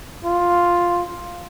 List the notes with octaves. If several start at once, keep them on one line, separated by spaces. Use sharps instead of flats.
F4